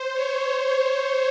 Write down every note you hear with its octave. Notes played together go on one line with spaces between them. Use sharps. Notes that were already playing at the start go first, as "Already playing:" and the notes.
Already playing: C5
C#5